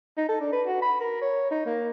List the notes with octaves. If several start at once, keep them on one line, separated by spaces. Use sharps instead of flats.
D#4
A4
D4
B4
F#4
B5
A#4
C#5
D#4
A#3